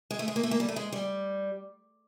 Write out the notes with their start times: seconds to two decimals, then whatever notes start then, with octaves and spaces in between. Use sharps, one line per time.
0.11 G#3
0.19 A3
0.28 G#3
0.36 A#3
0.43 A3
0.51 A#3
0.60 G3
0.69 A3
0.76 G#3
0.92 G3